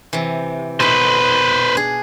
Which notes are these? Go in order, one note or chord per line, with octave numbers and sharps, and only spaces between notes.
C3 E3
B2 D#4 B4 C5
D4 G#4